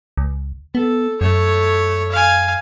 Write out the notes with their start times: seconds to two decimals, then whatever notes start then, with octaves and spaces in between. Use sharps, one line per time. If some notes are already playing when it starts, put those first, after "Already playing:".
0.17 C#2
0.75 B3 A4
1.21 F#2 A3 C#5
2.11 F5 G#5